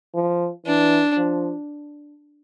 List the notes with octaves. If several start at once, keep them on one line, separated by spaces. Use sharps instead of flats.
F3
E3 D4
F3